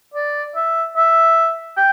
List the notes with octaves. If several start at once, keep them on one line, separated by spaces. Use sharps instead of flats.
D5
E5
E5
G5